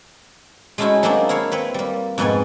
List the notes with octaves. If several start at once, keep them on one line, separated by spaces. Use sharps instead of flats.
G#3 A3 C#4 D#4 E4 F#4
F#3 A3 A#3 C4 D4 D#4
E4 A#4 C#5 F5
C4 B4 C#5
G3 A#3
F2 G#2 B2 B3 D#5 G#5